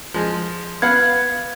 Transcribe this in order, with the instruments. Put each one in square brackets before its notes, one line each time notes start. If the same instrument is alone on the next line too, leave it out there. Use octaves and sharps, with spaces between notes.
[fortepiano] F3 G#3
[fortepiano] B3 F5 F#5 [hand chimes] G#6